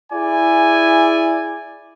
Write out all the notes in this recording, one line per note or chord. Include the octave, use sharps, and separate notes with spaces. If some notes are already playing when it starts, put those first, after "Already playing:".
E4 G#4 D5 G#5